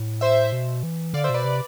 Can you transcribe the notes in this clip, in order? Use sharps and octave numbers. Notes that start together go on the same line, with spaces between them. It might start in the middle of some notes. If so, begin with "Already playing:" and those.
Already playing: A2
C5 E5
B2
E3
D3 D5 F5
C5 E5
B2 B4 D5
C3